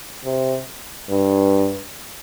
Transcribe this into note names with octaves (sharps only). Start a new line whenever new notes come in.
C3
G2